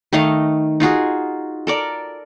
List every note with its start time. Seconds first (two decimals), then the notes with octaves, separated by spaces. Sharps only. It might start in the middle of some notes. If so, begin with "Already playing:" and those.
0.13 D#3 A3 D#5 F5
0.80 D#4 F4 F#4 G#4
1.67 A4 A#4 D5